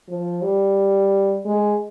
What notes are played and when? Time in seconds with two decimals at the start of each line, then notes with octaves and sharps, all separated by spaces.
0.08 F3
0.42 G3
1.45 G#3